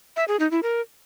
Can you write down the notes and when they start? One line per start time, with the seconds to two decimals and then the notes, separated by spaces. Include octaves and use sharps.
0.16 E5
0.28 G#4
0.40 D#4
0.51 E4
0.63 A#4